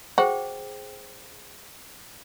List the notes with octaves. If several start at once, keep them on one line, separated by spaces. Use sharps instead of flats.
F#4 G#4 C5 G5